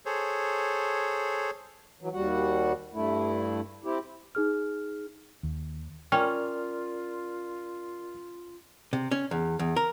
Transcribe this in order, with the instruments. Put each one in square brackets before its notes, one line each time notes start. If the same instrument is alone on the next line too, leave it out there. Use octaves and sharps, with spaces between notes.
[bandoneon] G#4 A4 C5 C#5
[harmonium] E3 F#3
D#2 G3 F#4 F#5
G2 A3 E4
C4 E4 G4
[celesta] D#4 G#4 F6
[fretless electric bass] D#2
[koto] C#4 [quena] F4 [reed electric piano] A#4 D5 F6 [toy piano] G5
[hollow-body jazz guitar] C3
C#4
E2
E2
A#4